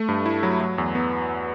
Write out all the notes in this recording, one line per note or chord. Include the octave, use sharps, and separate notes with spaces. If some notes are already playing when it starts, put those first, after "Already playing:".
Already playing: A3
G2
E4
F#3
F#3
E2
B3